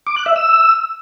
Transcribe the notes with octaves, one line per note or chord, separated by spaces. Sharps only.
D6
F#6
E5
E6